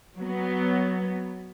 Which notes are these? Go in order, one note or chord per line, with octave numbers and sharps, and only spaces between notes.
F#3 B3